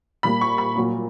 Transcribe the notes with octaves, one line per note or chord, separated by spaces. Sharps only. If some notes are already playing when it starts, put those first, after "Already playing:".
A#2 G3 A#3 B5
C#6
B5
A#2 F#3 A#3